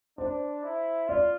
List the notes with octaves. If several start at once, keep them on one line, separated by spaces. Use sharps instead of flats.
D4 C5
E4
F4 D5